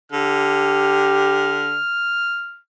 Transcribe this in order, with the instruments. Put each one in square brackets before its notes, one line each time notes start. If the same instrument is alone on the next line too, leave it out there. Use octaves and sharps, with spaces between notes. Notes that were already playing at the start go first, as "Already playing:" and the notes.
[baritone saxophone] D3 [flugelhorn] G4 [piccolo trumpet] F6